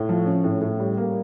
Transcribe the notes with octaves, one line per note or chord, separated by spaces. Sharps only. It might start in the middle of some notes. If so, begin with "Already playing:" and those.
Already playing: A2
F3
C#4
A2
A2
G3
A#3